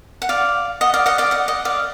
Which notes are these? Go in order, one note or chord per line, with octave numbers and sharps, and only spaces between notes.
F#5
D5 F5
D#5 F#5
D5 F5
D#5 F#5
D5 F5
D#5 F#5
D#5 F#5
D5 F5